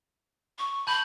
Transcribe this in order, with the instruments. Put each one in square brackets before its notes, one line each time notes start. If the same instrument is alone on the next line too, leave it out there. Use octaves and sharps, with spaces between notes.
[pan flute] C#6
[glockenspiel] A5 G6 F#7 [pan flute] B5